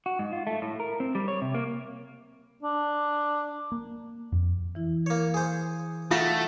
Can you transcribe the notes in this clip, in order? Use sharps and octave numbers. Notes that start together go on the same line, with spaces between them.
F#4
G#2
F4
A3
A2
A#4
C4
G3
C#5
C3
A#3
D4
A#3
F2
E3 E4
A#3 C#5
G#4 C5 G#5
A3 F4 F#4 F5